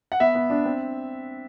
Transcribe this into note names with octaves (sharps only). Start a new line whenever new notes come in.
F#5
B3 E5
B3
D4
C4